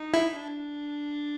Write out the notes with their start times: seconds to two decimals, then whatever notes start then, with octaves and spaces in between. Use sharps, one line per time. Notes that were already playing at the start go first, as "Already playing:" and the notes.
Already playing: D#4
0.14 E4
0.36 D4